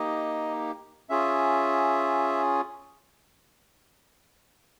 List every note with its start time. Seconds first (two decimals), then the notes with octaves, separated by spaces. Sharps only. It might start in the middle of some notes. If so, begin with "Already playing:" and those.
Already playing: A#3 D#4 G4 D#5
1.10 C#4 F4 G#4 E5